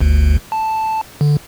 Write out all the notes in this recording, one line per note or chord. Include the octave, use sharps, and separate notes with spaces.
G1 D2
A5
D3